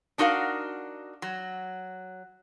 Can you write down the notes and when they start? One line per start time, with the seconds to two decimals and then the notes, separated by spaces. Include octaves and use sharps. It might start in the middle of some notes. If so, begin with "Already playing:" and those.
0.18 D4 D#4 F#4 A#4 F5
1.22 F#3